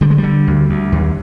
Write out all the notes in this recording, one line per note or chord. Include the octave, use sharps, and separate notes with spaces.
D3 G3
G#3
G3
D3
D2
D2
D#2